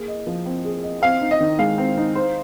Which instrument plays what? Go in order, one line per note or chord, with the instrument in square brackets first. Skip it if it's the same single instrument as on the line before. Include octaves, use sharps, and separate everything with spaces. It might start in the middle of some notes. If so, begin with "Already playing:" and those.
Already playing: [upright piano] A#3 G#4
D#5
F3
C4
G#4
D#5
[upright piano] C4 [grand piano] F5
[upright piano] D#4
[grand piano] D#5
[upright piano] D#3
[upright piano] G#3 [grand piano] F5
[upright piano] C4
D#4
C5